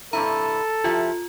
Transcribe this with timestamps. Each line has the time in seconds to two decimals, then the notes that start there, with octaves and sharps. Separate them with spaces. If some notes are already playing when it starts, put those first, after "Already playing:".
0.13 G2 C3 E4 A4 A#5
0.84 F3 E4 F4 G4